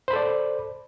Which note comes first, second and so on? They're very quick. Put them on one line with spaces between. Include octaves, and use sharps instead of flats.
C5 B5 A4 D5